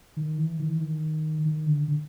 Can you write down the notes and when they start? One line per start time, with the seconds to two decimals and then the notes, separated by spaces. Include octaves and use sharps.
0.17 D#3
0.38 E3
0.59 D#3
0.69 E3
0.80 D#3
1.45 D#3
1.66 D3
1.88 D3